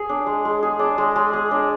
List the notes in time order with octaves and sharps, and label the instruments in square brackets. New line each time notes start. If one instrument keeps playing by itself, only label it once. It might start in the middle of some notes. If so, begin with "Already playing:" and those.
Already playing: [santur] G#4
D4
G#3
G#3
G#4
D4
G#3
G#3
G#4
D4